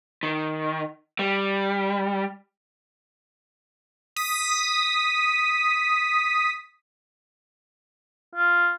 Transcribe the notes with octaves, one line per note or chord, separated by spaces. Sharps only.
D#3
G3
D#6 B6
F4